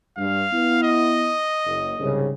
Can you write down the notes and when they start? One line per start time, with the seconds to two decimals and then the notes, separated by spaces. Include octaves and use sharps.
0.18 G2 F5
0.52 B3 E4
0.83 D#5
1.65 F#1
1.98 C2 G#2 C#3